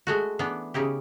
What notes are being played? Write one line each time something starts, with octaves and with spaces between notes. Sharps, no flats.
G#3 A3 F#4
E3 B3 D4
C#3 D#4 E4 G4